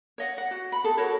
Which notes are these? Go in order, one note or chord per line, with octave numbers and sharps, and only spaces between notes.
C#5 D#5 F#5
F#5
F#4
B5
G#4 A4
F#4 A#4 C#5 F#5